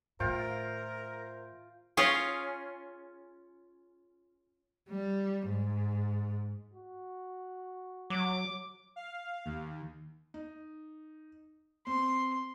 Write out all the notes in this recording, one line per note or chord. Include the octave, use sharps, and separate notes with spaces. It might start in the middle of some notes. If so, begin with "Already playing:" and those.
A2 D#3 F4 A#4 C5 E5 G5
C#4 F4 G#4
G3
G#2
F#4
F#3 D6
F5
D#2
D#4
C4 C6